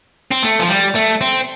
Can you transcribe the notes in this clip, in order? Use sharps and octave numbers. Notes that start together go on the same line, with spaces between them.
C4
A3
F3
G3
A3
C4